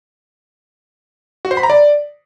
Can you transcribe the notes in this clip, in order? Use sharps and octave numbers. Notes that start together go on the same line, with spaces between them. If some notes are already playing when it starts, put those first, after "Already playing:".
F#4
C5
B5
A#5
D5